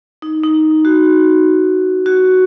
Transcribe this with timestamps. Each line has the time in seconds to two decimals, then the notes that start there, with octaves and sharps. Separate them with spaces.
0.22 D#4
0.43 D#4
0.85 F#4
2.06 F#4